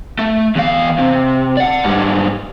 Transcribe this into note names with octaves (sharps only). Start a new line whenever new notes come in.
A3
E2 F5
C3
D5 F#5
G#2 G3